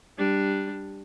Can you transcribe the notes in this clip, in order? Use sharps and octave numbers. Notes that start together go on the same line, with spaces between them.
G3 D4